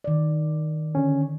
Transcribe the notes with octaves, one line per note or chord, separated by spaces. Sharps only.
D#3 D5
D3 C#4